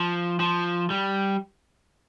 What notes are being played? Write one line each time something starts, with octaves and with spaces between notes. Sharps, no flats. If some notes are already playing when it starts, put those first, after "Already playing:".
Already playing: F3
F3
G3